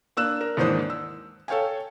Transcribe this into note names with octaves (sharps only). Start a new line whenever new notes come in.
A#3 D4 E6 F#6 E7
A#4
D#2 G#2 E3 D4 C5 D#6
E6
A4 C#5 F5 G5 G#5